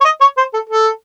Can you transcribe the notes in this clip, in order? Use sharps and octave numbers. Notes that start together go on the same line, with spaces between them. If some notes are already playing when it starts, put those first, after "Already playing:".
C#5
D#5
C#5
C5
A4
A4